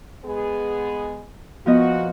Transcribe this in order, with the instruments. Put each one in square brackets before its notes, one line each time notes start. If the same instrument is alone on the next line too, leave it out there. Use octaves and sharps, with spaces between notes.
[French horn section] G#3 B3 G#4
[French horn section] A#2 F#4 [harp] F3 B3 D#5